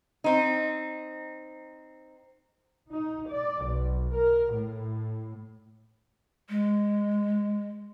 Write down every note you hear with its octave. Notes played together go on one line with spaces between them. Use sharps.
C4 D#4
D#4
D5
B1
A#4
A2
G#3